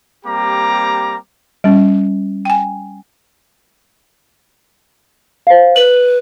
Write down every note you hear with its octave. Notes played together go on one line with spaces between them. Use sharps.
G3 A#3 C4 G4 A#5 D6
G3 C#4
G5 G#5
C5 F5
B4 F#7